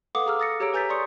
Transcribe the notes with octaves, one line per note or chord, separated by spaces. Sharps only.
A4 B4 F5 F#5 D6 D#6
G#4 A#5 D6 E6 F6
D#6 A6 A#6 C#7
G4 G#4 C#5 A#5 E6 D7
B4 G#5 A#5 G6 A6 B6
D5 C6 C#6 D#6 C#7